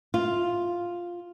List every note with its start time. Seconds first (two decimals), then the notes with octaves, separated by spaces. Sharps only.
0.14 F4